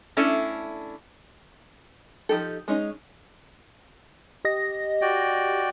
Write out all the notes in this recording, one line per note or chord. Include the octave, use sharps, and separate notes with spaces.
A3 C#4 D4 E4 A4 D5
F3 F#3 D#4 G4 A4
G#3 C#4 D#4
G4 D#5 A#6
F#4 D5 G5